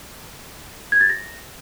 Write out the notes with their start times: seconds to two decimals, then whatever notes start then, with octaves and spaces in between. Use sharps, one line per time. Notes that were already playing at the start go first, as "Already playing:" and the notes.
0.92 G#6
1.01 A6
1.10 A#6